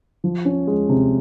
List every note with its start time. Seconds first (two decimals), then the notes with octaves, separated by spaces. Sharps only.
0.24 F3
0.45 C#4
0.67 G#3
0.89 C3